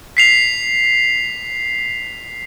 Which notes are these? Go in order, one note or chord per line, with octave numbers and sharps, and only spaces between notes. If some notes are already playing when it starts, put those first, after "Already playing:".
B6 C7 F7